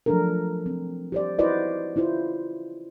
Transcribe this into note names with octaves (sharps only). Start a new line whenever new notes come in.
F3 F#3 A3 D4 A4 A#4
C4
G4 C5 D5
E4 F#4 B4 C5 D5 D#5
C#4 E4 F4 C5